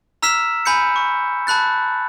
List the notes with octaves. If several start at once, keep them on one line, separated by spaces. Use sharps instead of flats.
A#5 E6 F6 B6 E7
G#5 B5 G6 C#7
C#6
A5 B5 F#6 A6